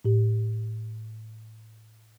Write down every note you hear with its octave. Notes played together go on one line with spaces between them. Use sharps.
A2 G4